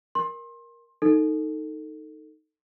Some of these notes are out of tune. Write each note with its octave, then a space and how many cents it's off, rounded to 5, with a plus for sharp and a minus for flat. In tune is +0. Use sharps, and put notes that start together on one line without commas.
A#4 +10 C6 +25
D#4 +0 A4 +20